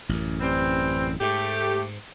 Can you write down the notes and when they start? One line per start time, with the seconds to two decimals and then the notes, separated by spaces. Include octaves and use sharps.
0.09 A1 F#2
0.41 E3 G3 C4
1.21 G#2 A3 G4